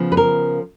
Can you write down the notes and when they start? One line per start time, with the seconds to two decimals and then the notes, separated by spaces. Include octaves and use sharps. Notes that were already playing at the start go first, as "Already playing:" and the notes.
Already playing: C#3 F3 B3
0.12 B4
0.17 A#4